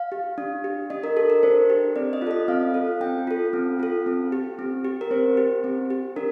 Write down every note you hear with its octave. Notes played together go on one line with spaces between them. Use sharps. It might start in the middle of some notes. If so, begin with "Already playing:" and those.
Already playing: F5
G4
D4
G4
D4 D#5
A#4
G4 A4
A#4
D4 C5
G4
C4 D5
D#5
F4
A4 D#5
C4 F5
F4 A4
C4 G5
F4 A4
C4
F4 A4
C4
G4
C4
G4
A#4
C4 C5
G4
C4
G4
D4 A#4